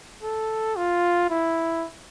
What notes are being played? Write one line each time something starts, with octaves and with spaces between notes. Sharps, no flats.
A4
F4
E4